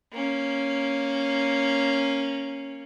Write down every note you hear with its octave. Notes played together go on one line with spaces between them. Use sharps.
A#3 C#4